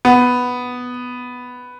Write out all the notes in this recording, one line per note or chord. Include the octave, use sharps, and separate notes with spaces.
B3